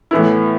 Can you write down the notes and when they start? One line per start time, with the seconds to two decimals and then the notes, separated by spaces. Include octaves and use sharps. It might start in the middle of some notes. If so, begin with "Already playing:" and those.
0.11 A2 E3 B3 E4